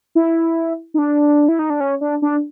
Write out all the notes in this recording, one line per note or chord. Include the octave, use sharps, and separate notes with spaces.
E4
D#4
D4
E4
D#4
D4
C#4
D4
D4